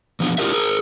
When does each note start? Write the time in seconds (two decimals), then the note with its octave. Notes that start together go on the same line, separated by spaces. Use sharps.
0.20 E3 F3 B3 D4
0.38 D4 E4 F4 G4 A#4 E5
0.53 G#4 A#4